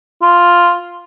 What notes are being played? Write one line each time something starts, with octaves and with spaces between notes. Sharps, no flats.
F4